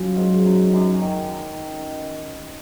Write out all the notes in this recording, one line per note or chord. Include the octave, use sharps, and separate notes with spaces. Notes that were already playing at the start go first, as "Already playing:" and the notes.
Already playing: F#3 C#4 F4
G#2
F#2
F#2
D#3